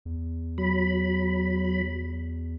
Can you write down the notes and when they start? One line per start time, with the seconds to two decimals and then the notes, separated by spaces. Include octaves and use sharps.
0.05 E2
0.58 F#3 B5